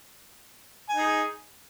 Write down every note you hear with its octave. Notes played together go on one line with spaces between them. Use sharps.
D#4 G#4 G#5